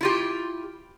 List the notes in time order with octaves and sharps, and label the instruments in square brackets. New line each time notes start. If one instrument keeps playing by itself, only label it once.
[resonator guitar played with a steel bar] E4 F4 G4